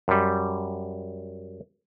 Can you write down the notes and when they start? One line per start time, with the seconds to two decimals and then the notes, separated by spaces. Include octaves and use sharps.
0.08 F#2 G3